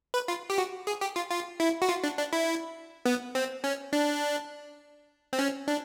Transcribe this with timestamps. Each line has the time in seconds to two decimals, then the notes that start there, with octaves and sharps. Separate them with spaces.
0.14 B4
0.28 F4
0.50 G4
0.58 F#4
0.87 G#4
1.01 G4
1.16 F4
1.31 F4
1.60 E4
1.82 F#4
1.89 F4
2.04 D4
2.18 D4
2.33 E4
3.06 B3
3.35 C4
3.64 C#4
3.93 D4
5.33 C4
5.39 C#4
5.68 D4